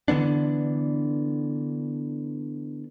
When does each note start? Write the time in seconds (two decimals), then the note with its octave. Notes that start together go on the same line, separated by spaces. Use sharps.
0.08 D3 E3 B3 D4